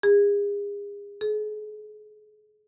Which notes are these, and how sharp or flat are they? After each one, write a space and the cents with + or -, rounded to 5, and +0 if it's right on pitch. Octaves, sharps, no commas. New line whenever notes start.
G#4 -40
G#4 +40